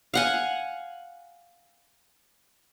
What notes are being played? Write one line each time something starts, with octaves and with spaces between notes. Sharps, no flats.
F5 F#5 G#5